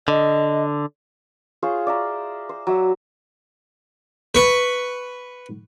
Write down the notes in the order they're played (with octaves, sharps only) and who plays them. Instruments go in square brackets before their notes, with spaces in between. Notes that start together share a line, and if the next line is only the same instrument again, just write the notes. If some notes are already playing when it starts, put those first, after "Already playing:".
[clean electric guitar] D3 [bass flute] D#5
[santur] F4 G#4 C5 C#5
D5 E5 A#5
C5
F#3 E5
[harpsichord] B4 C#6